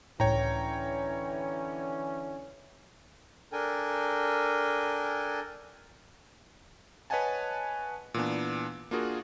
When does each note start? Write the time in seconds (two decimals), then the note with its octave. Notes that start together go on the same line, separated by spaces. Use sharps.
0.20 C#2 A2 D3 E3 C#4 C#5 G5 A#5
3.52 D4 A4 A#4 G5 G#5
7.10 B4 C#5 D#5 F#5 G#5 A5
8.14 A#2 E3 B3 D4
8.91 A#3 D4 F4 F#4 G#4 A#4